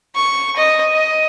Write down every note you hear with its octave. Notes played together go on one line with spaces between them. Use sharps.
C#6
D#5
D#5